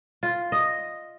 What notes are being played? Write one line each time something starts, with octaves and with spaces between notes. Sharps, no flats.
F4
D#5